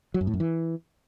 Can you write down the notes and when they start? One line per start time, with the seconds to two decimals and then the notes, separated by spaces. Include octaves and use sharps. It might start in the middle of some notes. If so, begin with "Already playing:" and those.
0.14 F#3
0.21 F#2
0.27 A2
0.34 F#2
0.40 E3